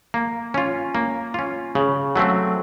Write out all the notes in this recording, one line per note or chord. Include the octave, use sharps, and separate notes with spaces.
A#3
C#4 F4
A#3
C#4 F4
C#3
F#3 A3 C4